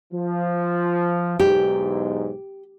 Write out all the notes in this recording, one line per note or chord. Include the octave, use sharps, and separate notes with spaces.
F3
B1 E2 G#2 G4